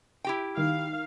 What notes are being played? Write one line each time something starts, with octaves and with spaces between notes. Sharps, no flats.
E4 G4 G5
D#3 F5